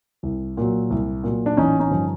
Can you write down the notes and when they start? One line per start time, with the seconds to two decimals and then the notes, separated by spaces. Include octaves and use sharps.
0.23 C2
0.57 A#2 F#3
0.90 C2
1.24 A#2 F#3
1.46 D4
1.57 A1 C#4 D#4
1.79 C#4 D#4
1.91 G2 D3 F3